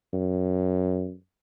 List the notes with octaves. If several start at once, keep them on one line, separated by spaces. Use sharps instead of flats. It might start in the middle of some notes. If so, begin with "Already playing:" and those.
F#2